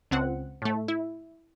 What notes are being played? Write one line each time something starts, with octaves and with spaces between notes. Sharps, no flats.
C#2 C4 F#5
A2 A3
E4